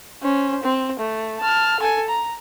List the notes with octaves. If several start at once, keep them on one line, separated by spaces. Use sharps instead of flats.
C#4 C5
C4
A3
A5 F6
A4 G#5
A#5